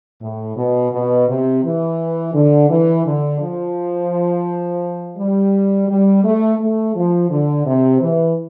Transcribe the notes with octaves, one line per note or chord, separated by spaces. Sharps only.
A2
B2
B2
C3
E3
D3
E3
D3
F3
G3
G3
A3
A3
F3
D3
C3
E3